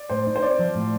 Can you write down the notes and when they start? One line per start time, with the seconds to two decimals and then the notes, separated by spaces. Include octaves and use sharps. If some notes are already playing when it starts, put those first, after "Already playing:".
Already playing: D5
0.10 A2 C5
0.27 D#4
0.36 C5
0.42 C4 D5
0.59 F3
0.75 A2